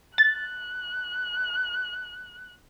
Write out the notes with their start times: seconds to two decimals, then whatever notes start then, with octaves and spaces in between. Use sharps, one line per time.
0.18 F#6 A6